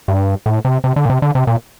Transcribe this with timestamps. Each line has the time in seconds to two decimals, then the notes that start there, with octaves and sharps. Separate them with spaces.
0.08 G2
0.46 A2
0.65 C3
0.84 C3
0.96 D3
1.05 A#2
1.10 C3
1.22 D3
1.35 C3
1.47 A#2